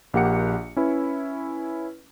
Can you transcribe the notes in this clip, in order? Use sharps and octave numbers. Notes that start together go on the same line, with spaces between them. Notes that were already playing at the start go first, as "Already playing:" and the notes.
A#1 A#3 G4 F#5 C#7
C#4 E4 B4